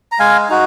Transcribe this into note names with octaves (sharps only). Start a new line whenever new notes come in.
A#5
G#3 F5 G#5
D#4 F#4